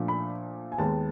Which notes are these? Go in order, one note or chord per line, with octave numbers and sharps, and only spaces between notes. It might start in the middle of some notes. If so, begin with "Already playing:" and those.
Already playing: A#2 F3 A3 D4
B5
G#5
D#2 D#3 G#3 B3 A5